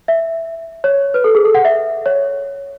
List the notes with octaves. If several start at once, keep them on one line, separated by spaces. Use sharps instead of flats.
E5
C#5
B4
A4
G#4
A4
F#5
E5
C#5